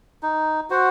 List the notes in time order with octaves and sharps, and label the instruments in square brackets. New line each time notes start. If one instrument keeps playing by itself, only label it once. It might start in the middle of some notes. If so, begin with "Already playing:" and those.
[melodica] D#4
F#4 C5 F#5